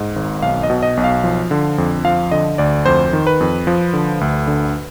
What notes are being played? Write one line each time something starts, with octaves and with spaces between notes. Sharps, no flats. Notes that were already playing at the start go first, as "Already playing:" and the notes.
Already playing: G#2
G#1
B1 F5
D#5
B2
D#5
B1
F5
F3
D3
F2
F3 F5
D3 D#5
D2 D5
F2 C5
D#3
B4
F2
F3
D3
D2
D3